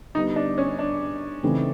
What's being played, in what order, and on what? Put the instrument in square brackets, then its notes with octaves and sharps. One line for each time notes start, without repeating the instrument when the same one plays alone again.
[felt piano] D3 G3 B3 [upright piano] D#4
[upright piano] D4
C#4
D4
[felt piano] C#3 E3 A3 C4 D#4